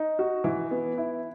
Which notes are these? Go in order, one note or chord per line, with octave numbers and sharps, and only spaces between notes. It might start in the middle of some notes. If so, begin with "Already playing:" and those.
Already playing: D#4
F#4
E3
B3
E4